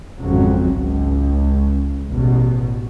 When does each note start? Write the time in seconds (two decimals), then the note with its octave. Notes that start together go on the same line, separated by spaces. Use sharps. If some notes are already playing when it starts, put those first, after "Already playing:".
0.19 G#1 F2 C#3 F#3
0.75 C#2
2.12 A1 E2 B2